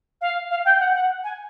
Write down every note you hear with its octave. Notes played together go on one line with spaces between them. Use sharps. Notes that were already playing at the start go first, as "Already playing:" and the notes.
F5
F5
G5
F#5
F#5
G#5